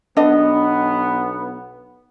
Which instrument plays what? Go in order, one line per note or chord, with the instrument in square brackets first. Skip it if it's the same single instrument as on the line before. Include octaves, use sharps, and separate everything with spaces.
[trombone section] B1 B3 [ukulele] D4 D#5